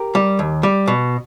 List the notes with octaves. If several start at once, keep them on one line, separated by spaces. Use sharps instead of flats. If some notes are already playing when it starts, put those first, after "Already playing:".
Already playing: G4 A#4
G3
D#2
G3
B2